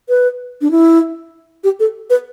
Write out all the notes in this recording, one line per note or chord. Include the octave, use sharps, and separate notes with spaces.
B4
D4
E4
G4
A4
B4